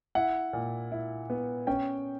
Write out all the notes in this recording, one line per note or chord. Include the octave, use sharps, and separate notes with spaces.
E4 F#5
A#2
E4
B3
C#4 G5